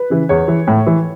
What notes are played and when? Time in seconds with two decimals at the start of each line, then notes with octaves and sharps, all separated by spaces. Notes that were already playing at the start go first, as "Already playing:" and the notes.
Already playing: B4
0.10 C#3 E3
0.29 E2 C#5
0.48 E3
0.67 A2
0.86 E3